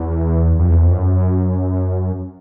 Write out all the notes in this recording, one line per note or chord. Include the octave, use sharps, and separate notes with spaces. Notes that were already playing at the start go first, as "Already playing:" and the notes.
Already playing: E2
F2
E2
F2
F#2